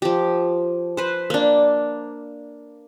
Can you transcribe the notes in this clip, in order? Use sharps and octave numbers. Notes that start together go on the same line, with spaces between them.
F3 G4
B4 C5
A#3 D4